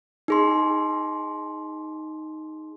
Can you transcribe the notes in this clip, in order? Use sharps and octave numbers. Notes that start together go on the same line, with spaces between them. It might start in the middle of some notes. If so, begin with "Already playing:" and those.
D#4 G#4 C6